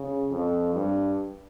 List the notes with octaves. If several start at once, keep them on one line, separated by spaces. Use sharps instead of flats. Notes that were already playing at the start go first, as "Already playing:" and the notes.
Already playing: C#3
F2
G2